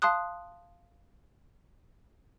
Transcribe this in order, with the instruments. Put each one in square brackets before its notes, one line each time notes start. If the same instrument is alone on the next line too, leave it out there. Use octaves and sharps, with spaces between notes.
[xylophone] F5 A5 C6 D#6 F#6